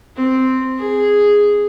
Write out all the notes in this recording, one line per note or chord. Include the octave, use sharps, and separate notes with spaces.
C4
G#4